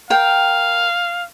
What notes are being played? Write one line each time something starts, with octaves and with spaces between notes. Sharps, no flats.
A#4 F5 G5